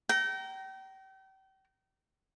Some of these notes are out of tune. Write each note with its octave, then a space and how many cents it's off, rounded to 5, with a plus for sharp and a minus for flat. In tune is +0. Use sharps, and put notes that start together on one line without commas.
G5 -35 A#5 +0